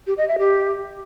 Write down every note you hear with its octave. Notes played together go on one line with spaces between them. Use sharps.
G4
D#5
E5
G4